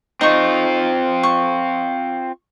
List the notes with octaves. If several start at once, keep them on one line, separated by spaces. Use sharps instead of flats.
C4 D#4 F4 C#6
C#6